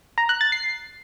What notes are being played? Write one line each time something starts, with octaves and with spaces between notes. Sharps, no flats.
A#5
F#6
A6
C7